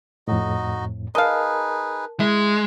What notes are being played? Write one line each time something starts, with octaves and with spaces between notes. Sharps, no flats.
F2 A2 D#4 F#4 D#5
D#4 G#4 A#4 B4 D#5 F5 A5
G#3 E4